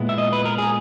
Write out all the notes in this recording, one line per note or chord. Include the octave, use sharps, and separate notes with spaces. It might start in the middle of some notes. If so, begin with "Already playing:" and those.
Already playing: A#2 G#3 B3 E4
E5
D#5
B4
A#4
G#4